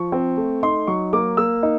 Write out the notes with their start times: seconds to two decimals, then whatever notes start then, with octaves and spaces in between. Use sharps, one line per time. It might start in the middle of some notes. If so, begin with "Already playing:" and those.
Already playing: F3 C#6
0.12 C4
0.37 A3
0.63 D#4 C6
0.87 F#3 C#6
1.13 A#3 D6
1.37 A#3 E6
1.63 D#4